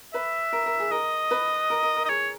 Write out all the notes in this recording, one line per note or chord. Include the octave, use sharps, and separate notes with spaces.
B4 E5
A#4
A#4
G#4
A#4 D#5
B4
A#4
A#4
A#4
D#5
G#4 C#5